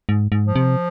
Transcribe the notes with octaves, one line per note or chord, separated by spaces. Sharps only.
G#2
G#2
F3
C3